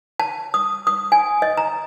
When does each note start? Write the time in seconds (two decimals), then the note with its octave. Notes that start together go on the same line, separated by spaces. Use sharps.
0.20 A5
0.54 D#6
0.87 D#6
1.12 G#5
1.42 D#5
1.57 A#5